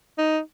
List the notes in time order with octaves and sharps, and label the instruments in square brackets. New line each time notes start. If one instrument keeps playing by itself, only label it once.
[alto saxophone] D#4